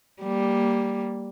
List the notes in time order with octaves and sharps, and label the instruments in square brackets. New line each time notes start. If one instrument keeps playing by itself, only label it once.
[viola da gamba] G3 A#3